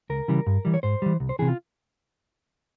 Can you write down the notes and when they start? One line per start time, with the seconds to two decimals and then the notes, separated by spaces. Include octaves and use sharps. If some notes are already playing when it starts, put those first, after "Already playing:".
0.10 C#2 A#4
0.28 C#3 E3 G3
0.47 G2
0.65 E3 G3
0.74 C#5
0.83 G#2 C5
1.02 E3 G3
1.20 C2
1.29 C5
1.39 C3 E3 G#4
1.48 F4